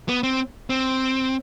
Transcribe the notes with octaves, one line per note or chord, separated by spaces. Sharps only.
B3
C4
C4